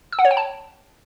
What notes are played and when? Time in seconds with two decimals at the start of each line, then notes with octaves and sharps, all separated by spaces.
0.12 E6
0.19 F#5
0.25 C#5
0.31 G5
0.37 A5